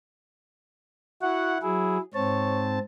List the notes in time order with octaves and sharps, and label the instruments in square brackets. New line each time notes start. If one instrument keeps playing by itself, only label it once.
[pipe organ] E4 F#5 [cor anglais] F#4
[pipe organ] F#3 G#4 [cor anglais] E4
[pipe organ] G#2 C4 A5 [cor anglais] C#5